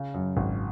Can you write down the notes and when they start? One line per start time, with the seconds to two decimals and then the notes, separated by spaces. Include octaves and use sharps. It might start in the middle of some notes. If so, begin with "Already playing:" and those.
Already playing: C#3
0.14 F#2
0.37 G#1